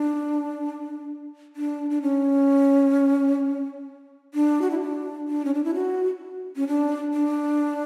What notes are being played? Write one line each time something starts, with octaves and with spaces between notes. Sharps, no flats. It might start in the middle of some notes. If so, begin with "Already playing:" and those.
Already playing: D4
D4
D4
C#4
D4
F#4
E4
D4
D4
C#4
D4
E4
F#4
C#4
D4
D4